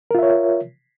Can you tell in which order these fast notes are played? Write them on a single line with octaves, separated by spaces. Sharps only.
A#4 F4 E5 C#5